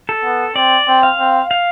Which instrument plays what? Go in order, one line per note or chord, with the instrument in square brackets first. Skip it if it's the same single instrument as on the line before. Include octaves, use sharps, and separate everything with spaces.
[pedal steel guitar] A4
[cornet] B3
[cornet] C4 [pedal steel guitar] D5
[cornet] C4
[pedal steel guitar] F5
[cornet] C4
[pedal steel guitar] F5